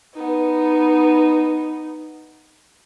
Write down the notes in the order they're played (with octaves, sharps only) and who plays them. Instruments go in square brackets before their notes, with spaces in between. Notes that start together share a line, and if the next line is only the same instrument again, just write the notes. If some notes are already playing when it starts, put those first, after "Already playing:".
[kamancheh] B3 D#4